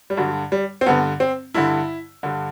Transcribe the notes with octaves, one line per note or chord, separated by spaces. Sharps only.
G3
G2 D3 F#3
G3
C4
G2 D3 B3
C4
G2 D3 E4
G2 D3